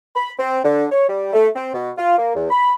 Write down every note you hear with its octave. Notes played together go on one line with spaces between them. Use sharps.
B5
C4
D3
C#5
G3
A3
C4
B2
F4
A#3
E2
B5